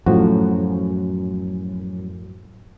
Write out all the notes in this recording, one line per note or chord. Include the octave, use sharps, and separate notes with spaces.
F#2 A2 F3 F#4